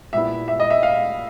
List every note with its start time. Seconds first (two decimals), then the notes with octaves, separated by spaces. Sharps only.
0.13 A#2 G3 B3 E4 E5
0.48 E5
0.60 D#5
0.70 E5
0.83 F5